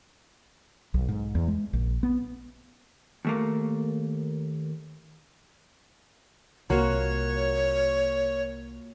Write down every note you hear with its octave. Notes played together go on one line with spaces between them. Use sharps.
B1
G#2
E2
G#3
A#1
B3
D#2 A3 A#3
C2 A#3 F4 F#4 C#5